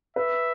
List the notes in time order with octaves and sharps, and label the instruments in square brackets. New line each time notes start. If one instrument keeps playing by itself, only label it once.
[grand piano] B4 [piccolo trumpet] E5